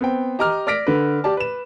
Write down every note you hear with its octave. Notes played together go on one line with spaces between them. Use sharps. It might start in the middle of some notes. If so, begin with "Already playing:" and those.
B3 C4 G5
G4 D#5 A#5 D6 F6
D5 D6 F6 A#6 B6 D7
D3 B4
G4 D5 A5
B4 E7